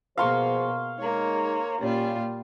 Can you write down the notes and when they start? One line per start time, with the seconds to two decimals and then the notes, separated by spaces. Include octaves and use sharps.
0.18 B2 F3 A#3 G#4 C5 F5 C6 C#6
0.99 G#3 A#3 D#4 C#5
1.80 A#2 G3 C#4 F4 G4